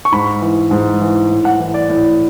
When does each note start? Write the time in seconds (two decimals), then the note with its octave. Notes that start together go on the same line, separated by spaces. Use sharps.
0.05 C#6
0.12 G#2 B5
0.42 E3
0.71 G#2
1.01 E3
1.31 A2
1.45 F#5
1.59 E3
1.74 D5
1.89 A2